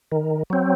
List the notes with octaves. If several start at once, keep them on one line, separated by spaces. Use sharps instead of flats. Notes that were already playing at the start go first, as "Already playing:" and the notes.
D#3
F#3 C4